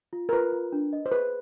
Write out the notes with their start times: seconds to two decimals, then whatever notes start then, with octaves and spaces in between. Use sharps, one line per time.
0.13 F4
0.29 A#4
0.32 F4 B4
0.52 F4
0.72 D4
0.93 D#5
1.06 C5
1.12 G#4 B4